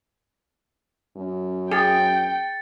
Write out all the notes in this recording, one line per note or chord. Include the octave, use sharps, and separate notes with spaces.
F#2
G#4 G5 A6 C#7